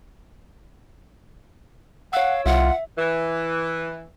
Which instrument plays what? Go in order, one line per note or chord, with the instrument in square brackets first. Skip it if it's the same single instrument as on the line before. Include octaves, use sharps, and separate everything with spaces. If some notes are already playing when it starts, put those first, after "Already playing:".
[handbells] C#5 E6 [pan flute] F5 [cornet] F#5
[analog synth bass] C2 [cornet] F4 [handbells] E5 [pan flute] F#5
[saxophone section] E3